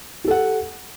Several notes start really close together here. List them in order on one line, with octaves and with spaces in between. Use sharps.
G4 A4 F#5